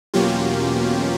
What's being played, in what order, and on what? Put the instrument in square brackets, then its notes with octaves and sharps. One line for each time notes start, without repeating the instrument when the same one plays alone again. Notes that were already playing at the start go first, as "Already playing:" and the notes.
[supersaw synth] E2 B2 F#3 A#3 C#4 F4 G4